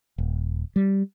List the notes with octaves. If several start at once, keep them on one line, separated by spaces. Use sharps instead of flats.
D#1
G3